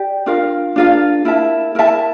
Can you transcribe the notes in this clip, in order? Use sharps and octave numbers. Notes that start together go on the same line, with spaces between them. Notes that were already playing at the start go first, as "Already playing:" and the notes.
Already playing: G4 D5
D4 F4 A#4 F5
D4 F4 A#4 F5
E4 A#4 E5 A5
E4 A#4 E5 A5